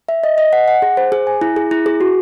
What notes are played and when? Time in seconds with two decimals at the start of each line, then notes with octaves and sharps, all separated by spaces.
0.09 E5
0.24 D#5
0.38 D#5
0.53 F#5
0.68 F#5
0.82 G#4
0.97 C5
1.12 G#4
1.27 G#5
1.41 E4
1.56 G#4
1.71 E4
1.86 G#4
2.01 F#4